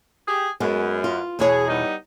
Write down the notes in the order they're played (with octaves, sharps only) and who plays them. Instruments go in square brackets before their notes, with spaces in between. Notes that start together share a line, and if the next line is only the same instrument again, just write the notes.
[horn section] G4 G#4
[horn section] F#2 [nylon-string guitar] G#3 B3
[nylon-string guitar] F4
[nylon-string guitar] E2 B2 C#5 [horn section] G#4
[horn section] G3 B3 D#4